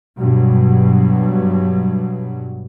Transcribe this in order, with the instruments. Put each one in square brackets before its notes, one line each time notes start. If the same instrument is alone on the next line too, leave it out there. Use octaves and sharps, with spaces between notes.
[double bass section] G2 B2 F#3